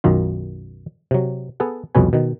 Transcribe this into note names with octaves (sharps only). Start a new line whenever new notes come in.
B1 F#2 D#3 F4
C3 F#3
B3 G#4 A4 F#5
C2 F2 B2 C#4 B4 G#5
B2 D#3